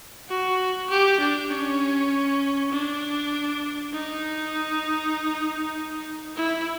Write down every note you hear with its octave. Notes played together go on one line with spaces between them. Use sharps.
F#4
G4
D4
C#4
D4
D#4
E4